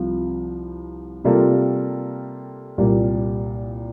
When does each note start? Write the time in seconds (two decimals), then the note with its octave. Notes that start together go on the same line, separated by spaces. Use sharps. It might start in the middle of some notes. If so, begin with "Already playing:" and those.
Already playing: C2 C3 F3
1.24 C3 G3 A#3 F4 A4
2.78 C2 A#2 G3 A#3